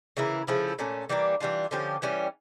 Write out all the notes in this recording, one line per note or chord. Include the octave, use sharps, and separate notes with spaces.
C#3 E3 A#3 E4
C#3 F3 A3 E4
A#2 A3 C#4
E3 G3 A#3 D4
E3 G3 D4 F4
D3 F3 C#4 G4
E3 G3 C#4